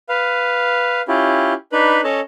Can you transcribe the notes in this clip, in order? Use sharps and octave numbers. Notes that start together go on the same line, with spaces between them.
B4 F5
C#4 E4 F4 G4
D4 D#4 B4 B5
C#4 A4 C#5 D#5 A5